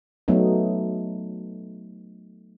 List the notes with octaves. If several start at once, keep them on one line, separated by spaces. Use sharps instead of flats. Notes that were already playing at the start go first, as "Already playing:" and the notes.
F#3 A3 B3 D#4